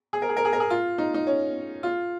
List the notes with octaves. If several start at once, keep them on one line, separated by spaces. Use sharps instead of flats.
G#4
A#4
G#4
A#4
G#4
A#4
G#4
F4
D#4
D#4
C#4
F4